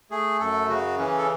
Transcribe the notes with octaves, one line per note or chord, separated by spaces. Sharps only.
A3 G#4
F#2 A4
C#3 F#4
E3 C#4
A4